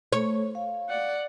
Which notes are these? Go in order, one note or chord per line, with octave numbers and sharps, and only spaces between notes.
A3 C#5
F5
D5 F#5